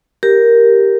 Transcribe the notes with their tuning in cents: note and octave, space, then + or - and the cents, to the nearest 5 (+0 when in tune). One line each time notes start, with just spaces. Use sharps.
G4 +0 A#4 +0